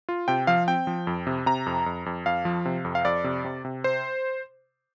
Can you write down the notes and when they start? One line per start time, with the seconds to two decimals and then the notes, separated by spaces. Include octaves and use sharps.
0.09 F4
0.28 C3 G5
0.47 F3 F5
0.68 C4 G5
0.87 F3
1.07 F2
1.27 C3
1.46 C3 A#5
1.66 F2
1.86 F2
2.06 F2
2.26 F2 F5
2.45 F3
2.65 C3
2.85 F2
2.95 F5
3.05 F2 D5
3.24 C3
3.45 C3
3.65 C3
3.84 C5